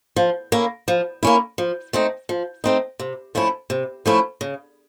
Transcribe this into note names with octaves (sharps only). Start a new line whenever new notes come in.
F3
A#3 C#4 E4
F3
A#3 C#4 E4
F3
A3 C4 D#4
F3
A3 C4 D#4
C3
F3 A3 C#4 E4
C3
F3 A3 C#4 E4
C#3